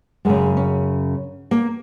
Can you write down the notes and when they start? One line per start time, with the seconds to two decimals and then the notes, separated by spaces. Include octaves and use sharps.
0.25 F#2 C#3 G#3
0.57 C#4
1.51 A#3